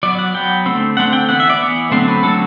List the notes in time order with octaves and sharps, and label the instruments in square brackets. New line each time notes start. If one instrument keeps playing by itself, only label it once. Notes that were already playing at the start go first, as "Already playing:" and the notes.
[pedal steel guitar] F#3 B3 D5
F#5
F#3 B3 G5
D3 A3 C4
D3 A3 C4 F#5
G5
E3 B3 F#5
E5
D5
E3 B3
D3 F#3 A3 C4 C5
B4
D3 F#3 A3 C4 A4